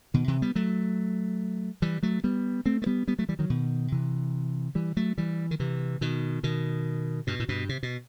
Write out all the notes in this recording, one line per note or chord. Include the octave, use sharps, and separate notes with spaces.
B2 D#3
C3 E3
G3 B3
F#3 A3
E3 G3
F#3 A3
G3 B3
A3 C4
A3
G3 B3
G3 B3
F#3 A3
E3 G3
D#3 F#3
B2 D#3
C3 E3
E3 G3
F#3 A3
E3 G3
D#3
C3 E3
B2 D#3
B2 D#3
G2 B2
A2
G2 B2
C3
B2